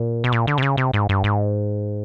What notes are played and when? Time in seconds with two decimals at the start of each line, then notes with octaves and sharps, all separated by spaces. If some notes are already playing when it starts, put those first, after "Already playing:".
Already playing: A#2
0.24 B2
0.32 A#2
0.47 D3
0.58 C3
0.62 C#3
0.77 C3
0.93 G#2
1.09 G2
1.24 G#2